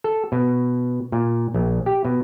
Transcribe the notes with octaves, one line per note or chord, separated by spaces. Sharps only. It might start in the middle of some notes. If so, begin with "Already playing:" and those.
A4
B2
A#2
A#1
G4
B2